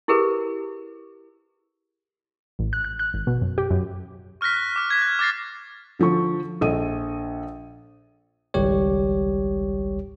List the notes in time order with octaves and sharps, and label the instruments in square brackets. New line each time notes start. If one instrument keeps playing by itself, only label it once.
[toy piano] E4 G4 G#4 A#4 B4
[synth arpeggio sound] A1
F#6
F#6
F#6
G#1
B2
F#2
G4
F#2
[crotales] C#6 F6 F#6 A#6 B6
F#6
D6 F6
G#6 B6
F#6 A#6
D6 F6 A6 A#6 C7
[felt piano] D3 F3 A4 C#6
A#1 A4 D#5 D#7
[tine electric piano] G#1 C#2 G3 G4 C#5